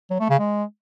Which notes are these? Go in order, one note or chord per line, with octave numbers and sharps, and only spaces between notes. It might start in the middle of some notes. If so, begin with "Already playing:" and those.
F#3
A3
C#3
G#3